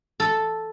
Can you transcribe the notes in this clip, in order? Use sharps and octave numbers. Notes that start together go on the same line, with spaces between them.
A4